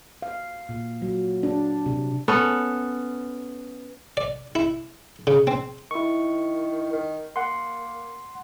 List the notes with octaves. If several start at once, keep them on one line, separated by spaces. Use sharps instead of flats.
F5
A#2
F#3
D4
C3
B3 C#4 A4
D5
E4
C#3
C4
D#3 E4 C#6
D#3
A#3 F#5 C6